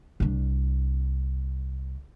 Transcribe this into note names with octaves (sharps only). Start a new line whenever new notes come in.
C2 D4